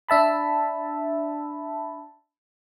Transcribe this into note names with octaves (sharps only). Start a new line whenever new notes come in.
D4 E5 A5 B5